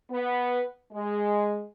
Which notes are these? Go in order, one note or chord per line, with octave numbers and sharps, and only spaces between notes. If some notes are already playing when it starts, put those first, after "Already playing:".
B3
G#3